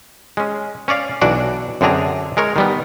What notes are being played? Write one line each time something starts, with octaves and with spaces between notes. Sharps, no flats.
G#3 C#4
C#4 C#5 D5 F5
B1 E3 D4 F#4 D5
F#2 D3 C4 D4 G#4 A#5
G#3 A#4 C#5
D#3 G3 B3